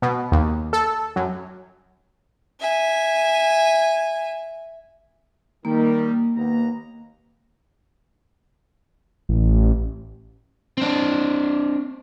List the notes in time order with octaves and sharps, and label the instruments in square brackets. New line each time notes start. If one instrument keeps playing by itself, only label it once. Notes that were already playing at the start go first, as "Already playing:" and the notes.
[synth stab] B2
D#2
A4
F#2
[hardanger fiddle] E5 G#5
[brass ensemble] D#3 G3 [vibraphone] A#3
[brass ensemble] D#2 B3 A#5
[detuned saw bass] A1
[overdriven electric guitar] C4 D4